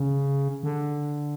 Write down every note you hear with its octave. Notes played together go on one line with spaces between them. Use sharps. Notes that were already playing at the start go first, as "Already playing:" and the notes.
Already playing: C#3
D3